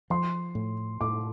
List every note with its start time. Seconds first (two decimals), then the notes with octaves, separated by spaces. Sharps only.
0.10 F3 C6
0.55 A2
1.01 A2 D6